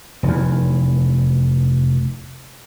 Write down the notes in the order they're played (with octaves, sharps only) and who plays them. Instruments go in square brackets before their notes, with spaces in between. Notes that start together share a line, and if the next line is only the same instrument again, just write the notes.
[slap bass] F1 E2